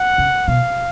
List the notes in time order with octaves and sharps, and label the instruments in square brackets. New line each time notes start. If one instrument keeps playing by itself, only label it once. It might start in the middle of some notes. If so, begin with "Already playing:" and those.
Already playing: [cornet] F#5
[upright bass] C#3
[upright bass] B2 [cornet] F5